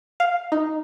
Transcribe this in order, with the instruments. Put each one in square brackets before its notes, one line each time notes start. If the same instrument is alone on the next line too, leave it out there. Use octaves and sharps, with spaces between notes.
[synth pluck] F5
D#4